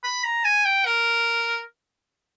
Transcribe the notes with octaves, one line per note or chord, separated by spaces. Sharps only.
B5
A#5
G#5
G5
A#4